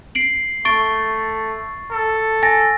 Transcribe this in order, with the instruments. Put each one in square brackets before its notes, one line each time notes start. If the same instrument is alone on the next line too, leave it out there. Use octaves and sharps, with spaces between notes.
[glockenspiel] C7 D7 F#7
[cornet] A3 [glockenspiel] C#6 A6 D7
[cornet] A4
[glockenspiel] G#5 A6 A#6